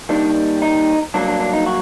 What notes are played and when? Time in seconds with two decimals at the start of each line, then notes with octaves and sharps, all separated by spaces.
0.09 D#2 D#3 G3 D4
0.62 D#4
1.14 G2 F#3 A#3 D4
1.27 D4
1.40 D4
1.53 D#4
1.66 F#4